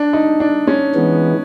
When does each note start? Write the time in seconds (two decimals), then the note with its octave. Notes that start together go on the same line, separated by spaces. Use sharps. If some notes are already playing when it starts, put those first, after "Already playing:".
Already playing: D4
0.13 D#4
0.40 D4
0.67 C#4
0.95 E3 G#3 B3